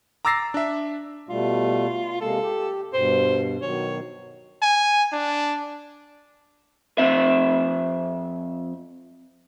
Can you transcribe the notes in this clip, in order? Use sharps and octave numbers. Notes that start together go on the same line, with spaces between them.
A#5 D6 E6 A6 A#6 C7
D4 E5
B2 G3 A3 F4
C3 G#3 A#3 A4
G4
G2 B2 C5
B2 D#3 F#3 C#5
G#5
D4
F2 C4 E5